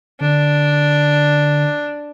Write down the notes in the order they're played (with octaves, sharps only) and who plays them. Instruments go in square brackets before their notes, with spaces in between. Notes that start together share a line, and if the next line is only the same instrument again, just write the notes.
[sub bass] D3 [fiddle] D4